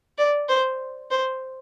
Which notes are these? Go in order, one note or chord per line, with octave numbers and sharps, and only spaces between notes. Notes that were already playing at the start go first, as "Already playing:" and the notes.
D5
C5
C5